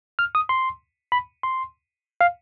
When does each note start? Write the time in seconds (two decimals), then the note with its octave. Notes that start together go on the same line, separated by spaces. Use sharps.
0.19 F6
0.35 D#6
0.49 C6
1.12 B5
1.43 C6
2.21 F5